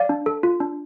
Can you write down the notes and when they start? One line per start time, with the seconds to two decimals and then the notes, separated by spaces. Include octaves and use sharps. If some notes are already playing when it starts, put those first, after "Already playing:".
Already playing: D5 F5
0.09 D4
0.26 A4
0.43 F4
0.60 D4